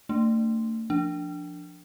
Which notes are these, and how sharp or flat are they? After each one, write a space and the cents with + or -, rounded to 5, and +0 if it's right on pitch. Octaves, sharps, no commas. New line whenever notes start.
A3 +40 D4 +0
F3 -5 D4 +0